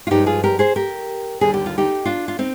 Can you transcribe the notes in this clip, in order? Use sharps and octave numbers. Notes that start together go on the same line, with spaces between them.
F4
G2 F3 G#3 D#4 G4
F4 G#4
G4 A#4
G#4 C5
G4 A#4
D#2 D3 G3 G#4
G4
F4
D#4 G4
D4 F4
F4
C4 D#4